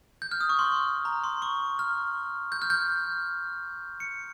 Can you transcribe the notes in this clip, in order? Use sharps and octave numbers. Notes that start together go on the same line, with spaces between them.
G6
F6
D#6
C#6
C6
A#5
C6
C#6
F6
G6
F6
G6
C#7